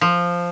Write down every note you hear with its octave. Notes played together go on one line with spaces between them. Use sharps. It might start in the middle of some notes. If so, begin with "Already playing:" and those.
F3